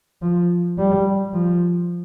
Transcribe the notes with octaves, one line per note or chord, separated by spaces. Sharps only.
F3
G3
F3